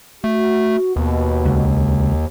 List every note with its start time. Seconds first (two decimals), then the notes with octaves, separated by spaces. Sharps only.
0.24 A3 F#4
0.96 D#2 B2
1.45 C#2